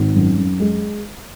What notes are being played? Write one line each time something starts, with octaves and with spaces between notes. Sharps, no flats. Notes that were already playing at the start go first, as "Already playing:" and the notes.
Already playing: G#1
F#2
F#2
G#3